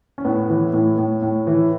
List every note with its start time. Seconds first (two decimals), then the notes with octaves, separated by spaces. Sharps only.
0.18 C#4
0.25 A2 B3
0.49 E3
0.73 A2
0.98 A2
1.22 A2
1.47 E3